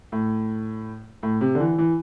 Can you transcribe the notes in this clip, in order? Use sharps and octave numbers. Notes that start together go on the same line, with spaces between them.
A2
A2
C3
D3
E3
E3